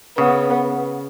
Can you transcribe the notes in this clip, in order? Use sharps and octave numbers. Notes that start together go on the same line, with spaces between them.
C#3 B3